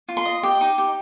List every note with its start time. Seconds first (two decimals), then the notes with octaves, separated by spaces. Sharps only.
0.09 F4
0.17 C6
0.25 D#5
0.43 G4 G5
0.61 D#4
0.78 G4